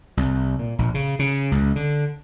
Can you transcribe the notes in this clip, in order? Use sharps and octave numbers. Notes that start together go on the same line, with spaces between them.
C2
A#2
A#1
C#3
C#3
C#2
D3